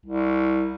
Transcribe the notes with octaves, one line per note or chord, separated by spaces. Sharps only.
C2